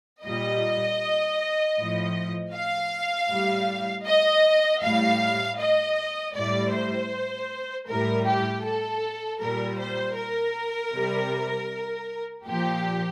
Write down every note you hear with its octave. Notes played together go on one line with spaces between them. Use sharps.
A#2 G3 D#5
A2 F3
F5
A2 G3
D#5
A2 G3 F5
D#5
A2 G3 D5
C5
A2 G3 A#4
G4
A4
A#2 G3 A#4
C5
A#4
C3 G3
A#2 F3 G4